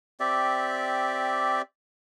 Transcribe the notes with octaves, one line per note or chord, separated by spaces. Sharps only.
C4 G4 D5 E5